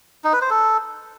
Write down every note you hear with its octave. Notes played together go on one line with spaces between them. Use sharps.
D#4
B4
C5
A4